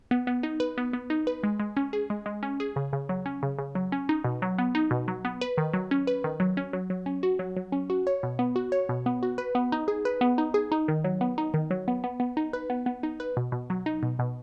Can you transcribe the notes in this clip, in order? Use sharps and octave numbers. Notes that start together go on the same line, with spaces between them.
B3
B3
D#4
B4
B3
B3
D#4
B4
G#3
G#3
C#4
G#4
G#3
G#3
C#4
G#4
C#3
C#3
F#3
C#4
C#3
C#3
F#3
C#4
D#4
B2
F#3
B3
D#4
B2
F#3
B3
B4
D#3
F#3
C#4
B4
D#3
F#3
C#4
F#3
F#3
C#4
F#4
F#3
F#3
C#4
F#4
C#5
B2
B3
F#4
C#5
B2
B3
F#4
B4
B3
D#4
G#4
B4
B3
D#4
G#4
D#4
D#3
F#3
B3
D#4
D#3
F#3
B3
B3
B3
D#4
B4
B3
B3
D#4
B4
B2
B2
F#3
D#4
B2
B2